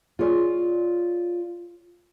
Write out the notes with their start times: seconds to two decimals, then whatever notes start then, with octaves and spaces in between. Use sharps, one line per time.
0.19 F4 G#4 C#5 D5